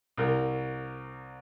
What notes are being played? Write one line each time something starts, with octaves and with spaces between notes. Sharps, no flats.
C2 A#4